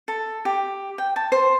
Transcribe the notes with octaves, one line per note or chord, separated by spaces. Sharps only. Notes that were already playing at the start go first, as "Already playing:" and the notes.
A4
G4
G5
A5
C5